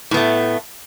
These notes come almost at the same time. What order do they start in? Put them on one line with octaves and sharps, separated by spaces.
A2 B3 A3